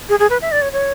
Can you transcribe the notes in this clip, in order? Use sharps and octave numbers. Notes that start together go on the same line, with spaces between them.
G#4
G#4
B4
E5
D5
C#5
C#5